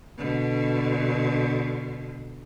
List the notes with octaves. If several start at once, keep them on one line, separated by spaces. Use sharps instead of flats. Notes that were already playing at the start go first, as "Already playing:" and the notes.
B2 D3